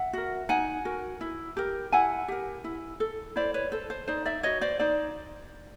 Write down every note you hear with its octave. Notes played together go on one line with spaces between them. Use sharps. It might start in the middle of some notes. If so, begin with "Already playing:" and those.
Already playing: E5 F#5
F#4 A#4
D#4 F#5 G#5
F#4 A#4
E4
G4 A#4
E4 F#5 G#5
G4 A#4
E4
A4
E4 C5 D5
B4 C#5
A4 C5
C5
D#4 C5 D5
D5 E5
F#4 B4 C#5 D#5
C5 D5
D#4 C5 D5